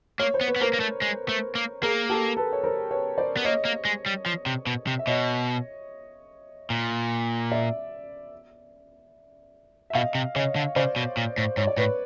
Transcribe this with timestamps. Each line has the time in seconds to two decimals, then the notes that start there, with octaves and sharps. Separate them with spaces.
0.20 A#3 C#5
0.34 C5
0.41 B3
0.48 B4
0.56 B3
0.61 A#3 A#4 C5
0.73 A#3
0.80 A3
1.02 G#3
1.29 A3
1.55 A#3
1.82 A#3 G#4 A#4
2.09 G4 A4
2.37 A4 B4
2.53 C#5
2.64 A#4 C5
2.91 B4 C#5
3.18 C5 D5
3.37 B3
3.45 A#3 C#5 D#5
3.65 A#3
3.85 G#3
4.06 G3
4.26 F3
4.46 C3
4.67 B2
4.87 C3
4.99 E5
5.07 B2 C#5 D#5
6.70 A#2
7.52 D5 E5
9.90 E5
9.95 B2 D#5 F5
10.15 C3
10.35 C#3 C#5 D#5
10.56 D3
10.76 C#3 C5 D5
10.96 B2
11.17 A#2
11.38 A2
11.57 G#2 C#5
11.67 D5
11.77 A2 B4 C#5